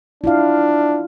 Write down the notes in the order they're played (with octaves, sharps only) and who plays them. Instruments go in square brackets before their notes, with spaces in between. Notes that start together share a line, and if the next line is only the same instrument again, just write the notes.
[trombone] D4 [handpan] E4 F4 F5